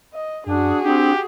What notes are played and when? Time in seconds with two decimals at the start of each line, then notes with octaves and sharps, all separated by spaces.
0.13 D#5
0.46 F#2 D4 F#4 G#4
0.85 C4 D4 G4